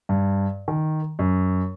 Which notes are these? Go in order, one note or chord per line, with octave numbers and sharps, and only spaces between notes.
G2
D#3
F#2